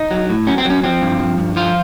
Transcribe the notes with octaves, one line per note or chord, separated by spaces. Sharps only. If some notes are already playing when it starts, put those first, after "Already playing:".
Already playing: D#4
F#3
A2
F#3 C#4
C4
F#3 C#4
F3 C4
G2
F3
G2
F3 F4